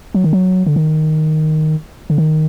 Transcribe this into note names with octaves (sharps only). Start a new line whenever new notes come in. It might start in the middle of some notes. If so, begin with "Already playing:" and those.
F#3
D#3
F#3
D3
D#3
D3
D#3